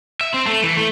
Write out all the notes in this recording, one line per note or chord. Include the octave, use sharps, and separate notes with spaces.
E5
C4
A3
E3
A3